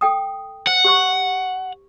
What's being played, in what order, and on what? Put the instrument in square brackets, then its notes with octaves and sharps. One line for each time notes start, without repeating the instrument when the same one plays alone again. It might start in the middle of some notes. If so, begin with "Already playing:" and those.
[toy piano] A4 G5 D#6
[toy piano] C5 [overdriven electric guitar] F#5
[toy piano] G4 C5 C#6